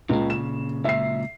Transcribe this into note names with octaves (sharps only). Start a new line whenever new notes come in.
C#2 A#2 C#3
E7
C#2 A#2 E5 C7